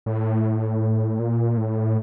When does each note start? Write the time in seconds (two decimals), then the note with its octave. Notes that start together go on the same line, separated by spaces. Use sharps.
0.06 A2
1.19 A#2
1.57 A2